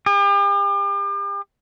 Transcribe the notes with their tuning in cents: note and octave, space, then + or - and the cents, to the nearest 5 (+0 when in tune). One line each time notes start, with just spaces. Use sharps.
G4 +40